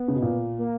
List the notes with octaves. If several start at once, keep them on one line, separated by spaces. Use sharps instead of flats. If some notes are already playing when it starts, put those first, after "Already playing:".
Already playing: B3
C#3
B2
A#2
A#3